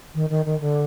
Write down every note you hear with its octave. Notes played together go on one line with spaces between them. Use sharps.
D#3
D#3
D#3
D3